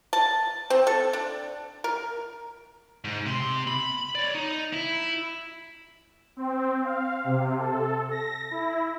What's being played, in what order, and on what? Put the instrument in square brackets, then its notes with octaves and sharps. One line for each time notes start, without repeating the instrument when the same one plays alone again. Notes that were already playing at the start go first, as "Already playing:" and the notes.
[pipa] A5
C4
A4
D4
A#4
[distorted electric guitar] G#2
C3 C6
B5
C#5 D5
D#4
E4
[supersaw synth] C4
F5
C3
A4
A#6
E4